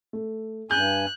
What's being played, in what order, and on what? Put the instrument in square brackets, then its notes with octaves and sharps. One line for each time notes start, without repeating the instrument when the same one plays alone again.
[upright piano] A3
[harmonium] G2 G#5 [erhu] F#6 [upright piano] G6